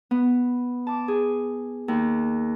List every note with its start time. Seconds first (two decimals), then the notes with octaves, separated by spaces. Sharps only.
0.11 B3
0.87 A5 D6
1.08 G#4
1.88 D#2